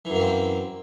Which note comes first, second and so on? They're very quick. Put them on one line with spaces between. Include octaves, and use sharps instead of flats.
E3 F#2 A#3 C4